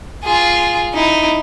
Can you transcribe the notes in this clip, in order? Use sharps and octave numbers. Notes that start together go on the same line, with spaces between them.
F4 G#4
D#4 E4